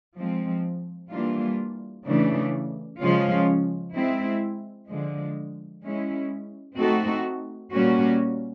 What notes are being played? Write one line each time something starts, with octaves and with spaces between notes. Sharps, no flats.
F3 G#3 C4
E3 G3 A#3 D4 F4
C#3 E3 A3 D4
C#3 F3 G#3 C#4 F4
G#3 C4 E4
D3 F3 G#3
G#3 C#4 E4
A3 C4 D#4 F#4 A4
A#2 G3 A#3 C#4 F#4